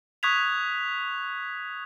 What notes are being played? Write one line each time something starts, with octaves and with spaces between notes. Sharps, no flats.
C#6 D#6 F#6 G#6 B6 F7